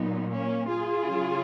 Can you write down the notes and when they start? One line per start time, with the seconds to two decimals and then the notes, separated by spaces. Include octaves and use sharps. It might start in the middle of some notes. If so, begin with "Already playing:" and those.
Already playing: A#2 F#3 B3 D#4
0.31 A#3 C#4
0.68 F4 G#4
1.06 C#3 F#3